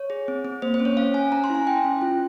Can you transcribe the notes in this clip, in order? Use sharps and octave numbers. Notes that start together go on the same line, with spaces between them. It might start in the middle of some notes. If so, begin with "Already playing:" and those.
Already playing: C#5
G#4
C4
C4
A#3 C5
C5
C#4
C#5
C#4 F5
C#4 G#5
C#4 A#5
C6
E4
G#5
E4 G5
C#4
F4